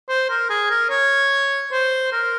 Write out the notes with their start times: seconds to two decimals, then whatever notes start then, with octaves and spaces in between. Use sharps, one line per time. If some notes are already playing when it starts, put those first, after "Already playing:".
0.09 C5
0.30 A#4
0.50 G#4
0.70 A#4
0.90 C#5
1.72 C5
2.12 A#4